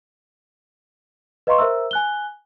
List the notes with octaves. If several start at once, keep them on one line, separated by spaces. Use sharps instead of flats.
B4 D#5 F5 A#5 C6 C#6
A#4 C5 E5 A#5 E6
G#5 F#6 G7